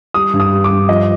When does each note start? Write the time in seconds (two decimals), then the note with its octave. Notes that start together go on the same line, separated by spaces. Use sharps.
0.14 G3 D#6
0.33 G2
0.40 D#6
0.52 G3
0.64 D6
0.70 G2
0.89 F3 D#5